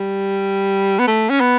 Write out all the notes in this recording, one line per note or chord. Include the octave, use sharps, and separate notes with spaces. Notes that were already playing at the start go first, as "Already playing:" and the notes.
Already playing: G3
B3
A3
C#4
B3